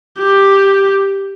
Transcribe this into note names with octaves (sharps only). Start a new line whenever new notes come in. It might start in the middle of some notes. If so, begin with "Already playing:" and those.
G4